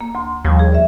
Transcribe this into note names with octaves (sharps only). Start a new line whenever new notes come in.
A#3
D2 C6
D#2 F3 G3
G#4
D5 E5